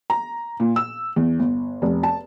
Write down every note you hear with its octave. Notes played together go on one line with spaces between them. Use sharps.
A#5
A#2
E6
E2
G1
F1
A5